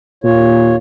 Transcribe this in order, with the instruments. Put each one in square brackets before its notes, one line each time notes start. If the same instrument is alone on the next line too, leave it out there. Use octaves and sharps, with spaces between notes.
[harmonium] D#2 F4 C#5 [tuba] A#2